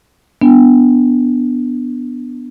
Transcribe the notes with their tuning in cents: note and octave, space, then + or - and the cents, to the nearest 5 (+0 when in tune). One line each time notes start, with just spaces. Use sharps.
B3 +0 D4 +0